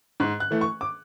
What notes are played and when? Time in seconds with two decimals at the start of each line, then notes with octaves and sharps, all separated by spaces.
0.20 G#2 F#6
0.40 F#6
0.51 E3 A3
0.61 C#6
0.81 D6